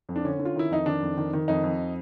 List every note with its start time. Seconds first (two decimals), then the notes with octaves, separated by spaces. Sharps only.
0.09 F2
0.16 D4
0.25 D3 C#4
0.39 D3
0.45 F4
0.56 D#3 E4
0.70 F2 D#4
0.86 D#3 D4
1.02 F2
1.17 D#3
1.33 D#3
1.48 F2 D#4
1.64 F2